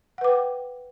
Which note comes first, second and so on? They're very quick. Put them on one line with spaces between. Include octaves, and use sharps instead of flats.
F#5 B4 D6 G5